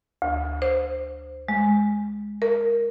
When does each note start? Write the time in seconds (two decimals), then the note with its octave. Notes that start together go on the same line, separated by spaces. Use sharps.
0.22 D2
0.62 C5
1.48 G#3
2.42 A#4